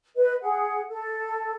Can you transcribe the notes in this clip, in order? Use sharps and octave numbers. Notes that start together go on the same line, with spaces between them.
B4 D#5
G#4 F#5
A4